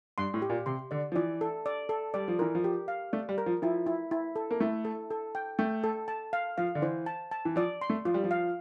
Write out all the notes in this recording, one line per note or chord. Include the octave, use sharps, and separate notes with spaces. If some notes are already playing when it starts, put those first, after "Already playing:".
G2 C6
A2
G4
A#2
C3 C6
D3 D5
F3
E3 D5
A4
D5
A4
G3 D5
F3
E3 A#4
F3
G4
F5
A3 D5
G3
A#4
F3
F3 E4
E4
E4
A4
A#3
A3 E4
A4
A4
G5
A3 G5
A4
A5
F5
F3 F5
D3
E3 C5
A5
A5
E3
F3 D5
C6
A3
F3 F4
G3
F3
F5